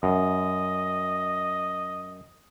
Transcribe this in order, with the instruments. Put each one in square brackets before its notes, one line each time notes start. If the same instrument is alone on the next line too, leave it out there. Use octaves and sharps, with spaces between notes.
[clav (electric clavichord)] F#2 [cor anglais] D#5